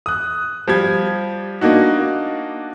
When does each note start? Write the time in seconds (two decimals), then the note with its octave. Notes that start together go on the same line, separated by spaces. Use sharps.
0.06 D#6 F#6
0.68 F3 G3 G#6
1.61 A#3 D4 D#4 F#4